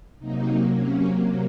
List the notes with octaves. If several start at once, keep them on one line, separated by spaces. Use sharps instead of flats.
C3 F#3 A#3 D#4
C#4